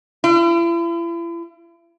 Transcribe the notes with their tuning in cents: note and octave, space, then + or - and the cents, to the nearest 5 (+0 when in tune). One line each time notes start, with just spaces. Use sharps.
E4 +40